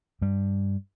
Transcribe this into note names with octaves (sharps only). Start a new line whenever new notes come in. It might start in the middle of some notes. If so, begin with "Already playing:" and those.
G2 G3